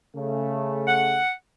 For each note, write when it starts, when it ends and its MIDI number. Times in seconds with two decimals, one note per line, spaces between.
0.16 1.20 49
0.16 1.20 57
0.87 1.30 78